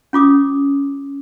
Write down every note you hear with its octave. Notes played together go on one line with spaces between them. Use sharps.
C#4 F4 D6 D#6